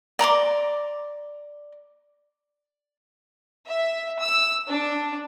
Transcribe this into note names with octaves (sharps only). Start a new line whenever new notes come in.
D5 A#5 C6 D6
E5
E6
D4